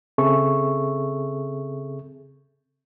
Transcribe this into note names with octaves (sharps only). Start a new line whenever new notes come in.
C#3 C4 G#4 A4 E5 C#6